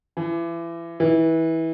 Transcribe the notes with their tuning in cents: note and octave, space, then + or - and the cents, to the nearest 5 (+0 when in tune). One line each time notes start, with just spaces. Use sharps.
E3 +35
E3 -20